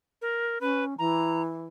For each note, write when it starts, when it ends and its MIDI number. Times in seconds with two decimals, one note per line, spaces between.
0.22 0.58 70
0.61 0.94 61
0.61 0.84 71
0.99 1.68 52
0.99 1.42 82